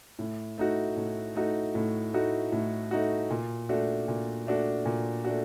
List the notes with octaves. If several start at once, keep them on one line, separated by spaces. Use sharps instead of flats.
A2
A3 D#4 F#4
A2
A3 D#4 F#4
A2
A3 D#4 F#4
A2
A3 D#4 F#4
A#2
A3 D4 F#4
A#2
A3 D4 F#4
A#2
A3 D4 F#4